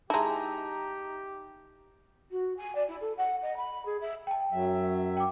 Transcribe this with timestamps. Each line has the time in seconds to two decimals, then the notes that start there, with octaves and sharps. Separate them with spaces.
0.10 G#3 D#4 E4 G4 E5 A5 A#5
2.31 F#4
2.57 G#5
2.75 D5
2.88 E4
3.00 A4
3.17 F#5
3.42 D#5
3.56 B5
3.85 G#4
4.00 E5
4.27 G5 A5
4.52 F#2 F#3 E5
5.17 G5 D6